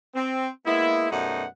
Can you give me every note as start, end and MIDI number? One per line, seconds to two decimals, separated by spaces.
0.15 0.48 60
0.66 1.10 56
0.66 1.10 58
0.66 1.10 59
0.66 1.10 64
1.11 1.45 42
1.11 1.45 47
1.11 1.45 55
1.11 1.45 57
1.11 1.45 63
1.11 1.45 78